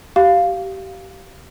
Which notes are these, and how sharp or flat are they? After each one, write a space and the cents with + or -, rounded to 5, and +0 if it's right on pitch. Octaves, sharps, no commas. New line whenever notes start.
G4 -25 F5 +0